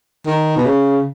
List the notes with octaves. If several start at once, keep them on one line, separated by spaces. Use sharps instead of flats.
D#3
B2
C#3